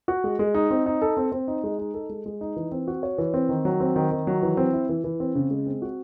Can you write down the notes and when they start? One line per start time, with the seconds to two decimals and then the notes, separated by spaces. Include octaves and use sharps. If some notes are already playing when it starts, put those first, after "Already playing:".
0.08 F#4
0.24 G#3
0.39 G#3
0.54 D#4
0.70 C4
0.86 D#4
1.02 A4
1.17 C4
1.32 C4
1.48 D#4
1.64 G#3
1.79 D#4
1.94 A4
2.09 G#3
2.26 G#3
2.41 D#4
2.56 E3
2.72 C4
2.87 F#4
3.03 C#5
3.18 E3
3.34 C4
3.49 D#3
3.65 F#3
3.80 C4
3.96 D#3
4.11 D#3
4.27 F#3
4.42 E3
4.57 C4
4.73 E4
4.89 E3
5.04 E3
5.20 C4
5.35 C#3
5.51 G#3
5.66 C4
5.82 F#4